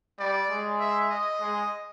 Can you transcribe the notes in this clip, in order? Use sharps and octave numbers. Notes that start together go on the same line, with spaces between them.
G3 D5
G#3
E5
D#5
G#3